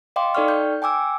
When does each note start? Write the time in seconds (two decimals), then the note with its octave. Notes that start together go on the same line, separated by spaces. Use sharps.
0.16 D#5 F5 G5 C6 D6
0.35 D#4 A4 D5 G5 C#6 F6
0.48 G6
0.82 G5 G#5 D6 E6